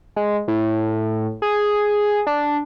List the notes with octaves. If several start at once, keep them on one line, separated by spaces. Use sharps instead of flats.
G#3
A2
G#4
D4